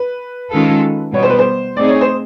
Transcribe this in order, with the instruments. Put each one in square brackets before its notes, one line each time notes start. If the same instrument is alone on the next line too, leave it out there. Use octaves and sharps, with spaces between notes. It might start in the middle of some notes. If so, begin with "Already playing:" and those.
Already playing: [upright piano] B4
[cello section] D#3 G#3 C#4 F4 A4
[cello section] B2 G3 B3 [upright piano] C#5
[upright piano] C5
B4
C5
[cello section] A3 C4 D#4 G#4 [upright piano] D5
[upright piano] C#5
C5